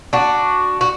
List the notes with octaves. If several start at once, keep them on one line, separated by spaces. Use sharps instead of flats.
D4 F#4
F#4